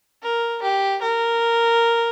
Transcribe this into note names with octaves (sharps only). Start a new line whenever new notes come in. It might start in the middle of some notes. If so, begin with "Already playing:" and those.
A#4
G4
A#4